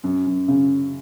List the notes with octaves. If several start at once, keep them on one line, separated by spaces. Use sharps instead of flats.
F#2
F#2
C#3